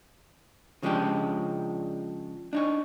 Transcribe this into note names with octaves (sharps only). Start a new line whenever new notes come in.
C#3 F3 G#3 C#4 D4 G4
D4 D#4 C#5